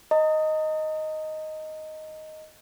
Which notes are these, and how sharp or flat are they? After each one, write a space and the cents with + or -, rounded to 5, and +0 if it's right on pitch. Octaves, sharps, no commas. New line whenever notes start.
D#5 +0 A#5 -35